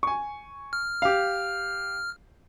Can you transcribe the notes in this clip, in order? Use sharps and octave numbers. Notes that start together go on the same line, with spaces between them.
G#5 C#6
F6
G4 F5